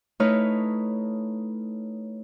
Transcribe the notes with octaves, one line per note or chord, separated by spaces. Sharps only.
A3 D#4 E4 B4 C#5 F6